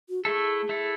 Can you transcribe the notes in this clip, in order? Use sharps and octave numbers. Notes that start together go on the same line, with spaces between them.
F#4
A3 E4 G#4 A4
A3 E4 A4